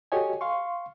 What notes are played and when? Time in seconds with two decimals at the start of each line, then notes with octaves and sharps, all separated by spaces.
0.12 F#4 G4 A4 C#5 D#5 G#5
0.41 F5 C6 C#6